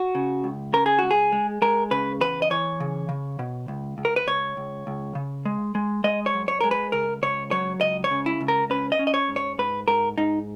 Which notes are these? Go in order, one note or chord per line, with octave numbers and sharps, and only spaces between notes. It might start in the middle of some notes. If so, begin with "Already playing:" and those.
Already playing: F#4
C#3
C#2
C#3 A#4
G#4
C#2 F#4
G#4
G#3
G#3 A#4
C#3 B4
E2 B4
D#5
E3 C#5
C#3
C#3
B2
C#2
C#2
A#4
B4
C#2 C#5
C#2
C#2
C#3
G#3
G#3
G#3 D#5
C#5
F#2
C#5
G#3 A#4
B4
C#2 A#4
C#2 C#5
F#3 C#5
C#2 D#5
C#5
C#3
E4
C#2
A#4
C#4 B4
D#5
C#4
D#5
C#5
G#2
C#5
G#2 B4
G#2 A#4
G#2 D#4